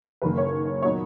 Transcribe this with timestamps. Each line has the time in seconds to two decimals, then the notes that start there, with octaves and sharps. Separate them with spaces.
0.22 F#1 F#2 D#3 A#3 B4
0.38 C#5
0.82 A#2 F#3 B3 D#4 C#5